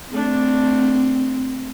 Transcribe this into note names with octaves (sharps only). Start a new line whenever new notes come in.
A3 C4 D4